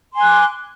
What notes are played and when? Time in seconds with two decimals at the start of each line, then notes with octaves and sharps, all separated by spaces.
0.12 C6
0.17 G#5
0.21 F#6
0.26 D6